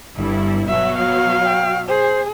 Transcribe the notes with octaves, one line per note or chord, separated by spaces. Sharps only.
G1 G2 E4
B2 F#3 E5
F5
G5
G#4 C5